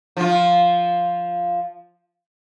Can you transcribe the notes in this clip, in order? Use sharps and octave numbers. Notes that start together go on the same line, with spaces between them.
F3 F4